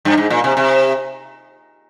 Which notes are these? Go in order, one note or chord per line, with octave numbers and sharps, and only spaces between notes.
G2
G#2
A#2
C3
C3